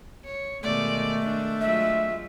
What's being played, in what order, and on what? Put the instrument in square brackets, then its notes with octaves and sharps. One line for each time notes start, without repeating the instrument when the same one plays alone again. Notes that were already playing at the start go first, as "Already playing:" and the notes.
[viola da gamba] C#5
[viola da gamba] B2 D#3 G#3 [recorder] A3 [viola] D5
[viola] D4
[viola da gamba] F#3 G#3 F4 [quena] E5